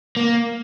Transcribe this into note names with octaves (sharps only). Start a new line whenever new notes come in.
A#3